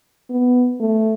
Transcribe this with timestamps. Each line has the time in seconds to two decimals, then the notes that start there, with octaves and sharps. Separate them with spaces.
0.29 B3
0.80 A3